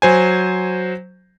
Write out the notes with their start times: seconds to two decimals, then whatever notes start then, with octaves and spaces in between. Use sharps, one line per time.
0.02 F#3 C5 G#5